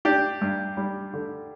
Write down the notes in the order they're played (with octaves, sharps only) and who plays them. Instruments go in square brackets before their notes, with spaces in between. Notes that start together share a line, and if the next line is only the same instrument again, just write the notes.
[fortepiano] D4 G4
G2
G3
D3